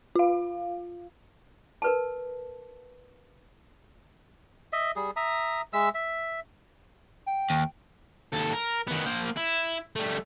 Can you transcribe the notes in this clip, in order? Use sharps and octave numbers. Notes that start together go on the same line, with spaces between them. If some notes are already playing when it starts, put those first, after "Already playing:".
F4 F5
A#4 B4 A5
D#5 E5
G3 G#4
E5 A#5 D#6
G#3 E5 E6
E5
G5
D#2
D#2 A4
A#4
D#3 B3
A#3 C5
E4
G3 A3